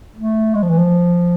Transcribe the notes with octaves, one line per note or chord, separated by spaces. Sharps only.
A3
G#3
F3
E3
F3